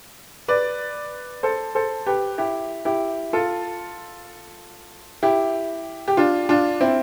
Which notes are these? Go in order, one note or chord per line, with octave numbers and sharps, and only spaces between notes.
B4 D5
A4 C5
A4 C5
G4 B4
E4 G4
E4 G4
F4 A4
E4 G4
G4
D4 F4
D4 F4
C4 E4